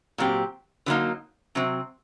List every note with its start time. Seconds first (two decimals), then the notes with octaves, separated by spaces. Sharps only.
0.18 A#2 F#3 C4 G4
0.86 D3 F#3 A#3 D#4
1.55 C3 F#3 C4